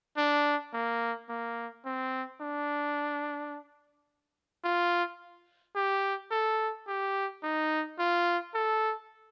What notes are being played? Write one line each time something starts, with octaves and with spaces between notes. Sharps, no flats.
D4
A#3
A#3
C4
D4
F4
G4
A4
G4
D#4
F4
A4